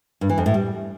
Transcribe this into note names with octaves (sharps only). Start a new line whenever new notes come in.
G2
E3
F2
A2
G3